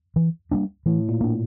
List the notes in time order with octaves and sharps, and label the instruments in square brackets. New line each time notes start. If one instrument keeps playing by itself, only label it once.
[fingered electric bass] E3
G3 A#3 D4
[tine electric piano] A2 [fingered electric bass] E3
[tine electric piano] A#2
[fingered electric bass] A#3 D4